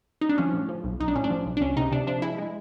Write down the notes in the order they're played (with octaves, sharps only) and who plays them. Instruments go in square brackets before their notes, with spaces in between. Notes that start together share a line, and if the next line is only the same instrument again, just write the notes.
[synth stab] D#4
D4
F3 C#4
A2
F3
B1
B1 D#4
D4
A2 C#4
D4
F3
B1
D4
C#2 C#4
C3 D#4
C3 D4
F3 D4
G#3 E4
G#3